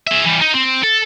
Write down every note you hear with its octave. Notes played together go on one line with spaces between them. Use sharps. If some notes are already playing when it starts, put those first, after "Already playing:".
G#4 E5
E3 G3
D#4
C4
A4